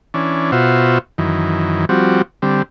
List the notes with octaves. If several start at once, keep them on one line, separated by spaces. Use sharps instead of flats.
E3 C#4 D4
B2 F4 F#4 C5 E5
F#2 D#3 E3
F3 G3 C4 F#4
D3 G3 C4